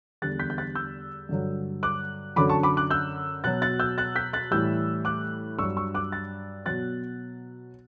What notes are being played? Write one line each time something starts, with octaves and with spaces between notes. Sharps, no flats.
E2 D3 G3 F#6 A6
G6 B6
G6
F#6 A6
E6 G6
G2 D3 F#3
D6 F#6
F#2 D3 F#3 B5 D6
A5 C#6
B5 D6
D6 F#6
E6 G6
B2 F#3 F#6 A6
F#6 A6
E6 G6
F#6 A6
G6 B6
F#6 A6
A2 E3 G3 E6 G6
D6 F#6
G2 F#3 C#6 E6
C#6 E6
D6 F#6
F#6 A6
B2 F#3 F#6 A6